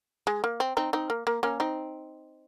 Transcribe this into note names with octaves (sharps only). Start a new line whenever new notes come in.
G#3
A#3
C4
C4 D#4
C4 D#4
A#3
A#3
A#3 C#4
C4 D#4